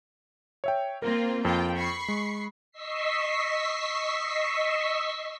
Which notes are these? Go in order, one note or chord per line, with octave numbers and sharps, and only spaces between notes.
C#5 E5 G5
A#3 C4 F4 A#4
F2 F4 G5
B5 C#6 C7
G#3
D#5 C#6 E6 B6 C7